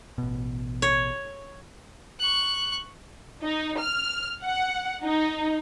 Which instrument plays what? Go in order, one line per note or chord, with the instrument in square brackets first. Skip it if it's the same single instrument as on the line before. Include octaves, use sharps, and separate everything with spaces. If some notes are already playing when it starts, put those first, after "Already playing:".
[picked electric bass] A1 B2
[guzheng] C#5
[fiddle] C#6 F#6
[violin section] D#4
F6
F#5
D#4